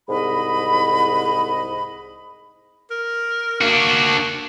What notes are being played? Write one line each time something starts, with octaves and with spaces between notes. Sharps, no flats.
C2 G#2 D#5 B5
A#4
A#3 D4 F#4